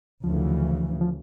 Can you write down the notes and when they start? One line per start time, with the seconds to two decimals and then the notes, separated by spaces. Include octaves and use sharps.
0.23 D2 C#3 E3 F3
1.01 F3